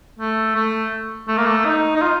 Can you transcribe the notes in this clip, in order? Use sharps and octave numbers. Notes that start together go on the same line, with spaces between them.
A3
A3
A3
A#3
A3
D#4
D#4
F4